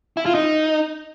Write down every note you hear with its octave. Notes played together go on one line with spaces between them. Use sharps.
E4
F4
D#4